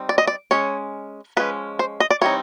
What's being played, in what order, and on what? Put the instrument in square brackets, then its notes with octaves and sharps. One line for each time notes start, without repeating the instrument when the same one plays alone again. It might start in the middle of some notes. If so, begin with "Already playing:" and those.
Already playing: [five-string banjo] G3 C4 D#4
D5
D#5
D5
G#3 C#4 C#5
F3 G#3 C#4 B4
C5
D#5
D5
E3 G3 C4 D#4 C#5